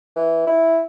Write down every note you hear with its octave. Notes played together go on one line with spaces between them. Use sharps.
E3
E4